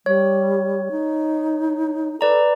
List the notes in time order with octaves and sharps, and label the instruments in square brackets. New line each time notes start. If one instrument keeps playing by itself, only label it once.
[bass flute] G3 [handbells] C#5
[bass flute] D#4
[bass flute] A4 [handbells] B4 D5 A#5